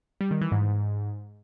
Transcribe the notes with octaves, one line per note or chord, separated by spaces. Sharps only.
G3
D#3
E3
G#2